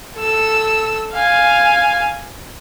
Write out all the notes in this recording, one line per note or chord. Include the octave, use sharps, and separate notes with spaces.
A4 E6
F5 G#5